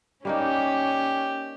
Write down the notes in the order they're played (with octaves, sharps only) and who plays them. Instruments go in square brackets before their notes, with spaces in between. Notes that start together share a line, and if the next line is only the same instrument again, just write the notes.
[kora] G3 A#3 D#4 [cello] C#4 [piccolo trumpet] G4